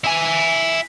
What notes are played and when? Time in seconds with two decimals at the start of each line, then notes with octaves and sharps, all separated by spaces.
0.04 E4 G#5